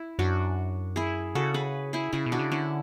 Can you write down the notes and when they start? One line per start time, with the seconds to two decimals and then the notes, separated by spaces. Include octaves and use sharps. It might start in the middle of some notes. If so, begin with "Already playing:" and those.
Already playing: E4
0.19 F#2 D4 F#4
0.96 E4 G#4
1.35 C#3 F#4 A4
1.54 G#4 B4
1.93 E4 G#4
2.13 C#3 E4 G#4
2.26 B2
2.32 D4 F#4
2.39 C#3
2.51 D3 C#4 E4